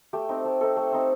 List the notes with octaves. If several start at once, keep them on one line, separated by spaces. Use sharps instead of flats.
A3 G4
C4 D#4
A3
C4 D#4 A4
A3
C4 D#4